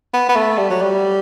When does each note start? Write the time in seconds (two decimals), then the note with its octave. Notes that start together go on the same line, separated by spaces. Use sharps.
0.14 B3
0.29 B3
0.36 A3
0.57 G3
0.70 F#3
0.82 G3